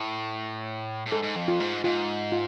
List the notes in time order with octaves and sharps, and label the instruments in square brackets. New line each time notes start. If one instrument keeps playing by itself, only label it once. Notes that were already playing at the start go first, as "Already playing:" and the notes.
Already playing: [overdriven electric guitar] A2
A2
[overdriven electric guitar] G#2 [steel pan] A4
[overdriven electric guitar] G#2
F2
[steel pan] F4
[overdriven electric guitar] G#2
[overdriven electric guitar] G#2 [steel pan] F4
[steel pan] F4